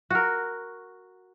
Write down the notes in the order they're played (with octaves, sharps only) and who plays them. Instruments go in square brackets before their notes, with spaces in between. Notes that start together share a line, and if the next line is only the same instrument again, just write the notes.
[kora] F#4 A#4